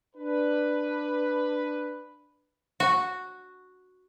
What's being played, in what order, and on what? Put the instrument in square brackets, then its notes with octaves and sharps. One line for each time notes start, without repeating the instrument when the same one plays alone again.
[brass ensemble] D4 B4
[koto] F#4